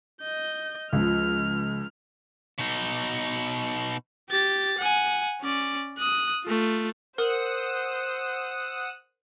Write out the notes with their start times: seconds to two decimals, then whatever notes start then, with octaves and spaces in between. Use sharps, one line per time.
0.22 D#5 G6
0.93 C#2 F3 F6
2.59 B2 D#4
4.30 G4 A6
4.78 F#5 G#5
5.41 C#4 D5
5.98 D#6 F#6
6.45 A3 F4
7.18 A#4 C5 F#5 D#6 E6